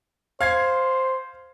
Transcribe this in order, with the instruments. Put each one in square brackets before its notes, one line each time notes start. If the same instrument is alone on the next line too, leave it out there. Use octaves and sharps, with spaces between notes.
[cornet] C5 [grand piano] F5 G#6 C7